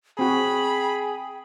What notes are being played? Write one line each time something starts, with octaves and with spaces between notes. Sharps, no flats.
C4 F#4 G#4 G5 B5